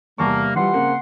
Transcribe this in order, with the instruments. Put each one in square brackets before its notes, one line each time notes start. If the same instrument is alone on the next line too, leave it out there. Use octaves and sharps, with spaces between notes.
[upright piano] E2 A5 C#6 [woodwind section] C3 G3 A#3
[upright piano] E3 F3 G3 [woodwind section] F#5 C6
[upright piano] C#3 A#3 C4